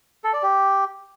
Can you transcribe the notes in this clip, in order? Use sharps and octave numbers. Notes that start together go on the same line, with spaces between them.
A4
D5
G4